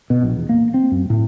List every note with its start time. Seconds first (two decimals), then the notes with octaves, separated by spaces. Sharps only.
0.10 B2
0.23 A#1
0.36 E2
0.49 A#3
0.74 C4
0.92 F#2
1.10 A2